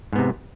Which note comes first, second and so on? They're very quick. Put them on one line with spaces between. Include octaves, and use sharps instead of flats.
G#2 B3 C3